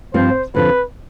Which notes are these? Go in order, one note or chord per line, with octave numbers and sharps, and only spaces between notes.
G2 F3 C4 C5
F2 D3 F3 B4